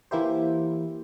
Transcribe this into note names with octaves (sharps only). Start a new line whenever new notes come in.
E3 A#3 E4 G4 C5